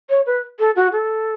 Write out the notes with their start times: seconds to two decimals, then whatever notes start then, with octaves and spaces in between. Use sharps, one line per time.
0.10 C#5
0.26 B4
0.59 A4
0.76 F#4
0.92 A4